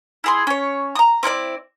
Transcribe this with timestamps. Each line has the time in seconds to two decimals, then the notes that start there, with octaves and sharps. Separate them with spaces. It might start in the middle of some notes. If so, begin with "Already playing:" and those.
0.24 E4 G#4 C6
0.47 C#4 C#5
0.95 A#5 D#6
1.23 C4 E4 A#4 D5